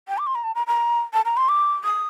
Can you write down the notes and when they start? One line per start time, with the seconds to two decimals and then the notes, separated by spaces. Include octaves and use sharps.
0.08 G5
0.18 D6
0.27 C6
0.35 A#5
0.44 A5
0.55 A#5
0.67 A#5
1.13 A5
1.25 A#5
1.37 C6
1.49 D6
1.84 D#6